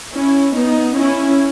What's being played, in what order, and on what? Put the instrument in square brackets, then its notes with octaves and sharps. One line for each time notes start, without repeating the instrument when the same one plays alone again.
[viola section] C#4 E4
B3 D#4
C#4 E4